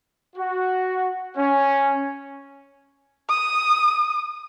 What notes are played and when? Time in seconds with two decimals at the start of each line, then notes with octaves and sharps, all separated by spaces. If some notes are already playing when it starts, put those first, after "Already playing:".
0.36 F#4
1.37 C#4
3.30 D#6